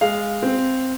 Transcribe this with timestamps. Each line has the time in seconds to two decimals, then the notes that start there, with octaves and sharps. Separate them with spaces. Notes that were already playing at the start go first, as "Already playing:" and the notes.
0.01 G#3 F5
0.43 C4